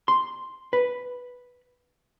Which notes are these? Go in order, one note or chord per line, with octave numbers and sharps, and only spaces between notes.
C6
B4